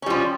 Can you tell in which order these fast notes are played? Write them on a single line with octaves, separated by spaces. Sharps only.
C#4 G3 F3